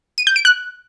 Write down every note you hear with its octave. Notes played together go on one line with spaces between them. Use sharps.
D#7
G6
D7
F#6